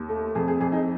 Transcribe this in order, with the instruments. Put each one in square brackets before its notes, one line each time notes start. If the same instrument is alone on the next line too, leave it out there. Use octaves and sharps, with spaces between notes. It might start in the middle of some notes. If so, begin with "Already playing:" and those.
Already playing: [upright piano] D#2
A3
F2 G#4
G#4
F2 G#4
D#4